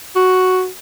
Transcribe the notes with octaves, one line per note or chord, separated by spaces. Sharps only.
F#4